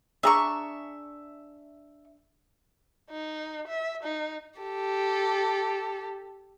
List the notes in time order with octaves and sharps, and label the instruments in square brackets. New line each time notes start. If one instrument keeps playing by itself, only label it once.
[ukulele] D4 G#4 A#5 [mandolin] E5 C#6
[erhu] D#4
E5
D#4
[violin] G4 A4